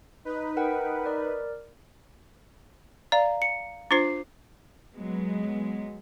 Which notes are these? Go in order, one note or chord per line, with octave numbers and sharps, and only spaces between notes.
D#4 B4
A#4 F#5 G5
A#4 D5
D5 F5 A#5
C#7
D4 F4 C5 D6 C7
F#3 G#3 B3